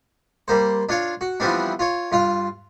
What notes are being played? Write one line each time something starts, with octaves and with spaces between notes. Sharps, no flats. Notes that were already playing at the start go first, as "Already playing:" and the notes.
G3 A#3 C5
D4 F4 C#5 F5
F#4
E3 F3 G3 B3 C4 D4
F4 C#5
G2 F4 F5